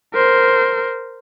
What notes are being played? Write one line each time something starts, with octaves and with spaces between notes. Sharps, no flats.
A#4 C5